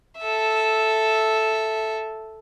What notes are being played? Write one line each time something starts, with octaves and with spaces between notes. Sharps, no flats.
A4 E5